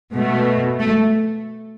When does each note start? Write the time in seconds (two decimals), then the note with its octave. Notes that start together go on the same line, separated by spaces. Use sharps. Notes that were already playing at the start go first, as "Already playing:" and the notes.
0.14 B2 A3
0.79 A3